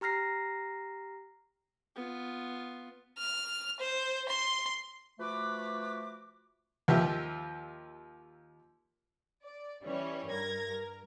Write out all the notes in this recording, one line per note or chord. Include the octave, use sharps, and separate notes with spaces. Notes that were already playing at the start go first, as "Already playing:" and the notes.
G4 A#5 F6 A#6 C7
B3 F4
F6
C5
C6
F3 A3 F#4 B4 D6
D#2 F3 G4 E5
D5
E3 G3 C#4 C#5
G2 A#4 G#6 A#6
A#4